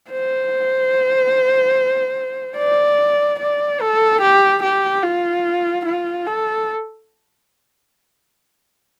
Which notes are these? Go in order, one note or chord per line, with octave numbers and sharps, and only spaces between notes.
C5
D5
D5
A4
G4
G4
F4
F4
A4